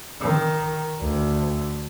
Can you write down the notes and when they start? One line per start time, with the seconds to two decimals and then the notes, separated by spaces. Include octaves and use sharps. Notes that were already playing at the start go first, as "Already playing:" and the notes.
0.21 D#3
1.00 D2